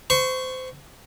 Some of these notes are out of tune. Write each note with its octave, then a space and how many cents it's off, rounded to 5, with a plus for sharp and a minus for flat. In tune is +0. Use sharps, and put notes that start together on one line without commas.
C5 -25 C#6 +0